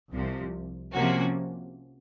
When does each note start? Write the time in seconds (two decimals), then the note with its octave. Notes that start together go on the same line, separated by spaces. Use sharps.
0.12 C2 C3 F3
0.93 C3 F3 A#3 C#4 F#4